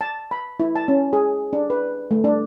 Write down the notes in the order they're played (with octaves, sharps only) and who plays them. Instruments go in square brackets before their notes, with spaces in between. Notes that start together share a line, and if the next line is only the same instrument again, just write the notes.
[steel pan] A5
B5
E4
A5
C#4
G#4
D4
B4
A3
D4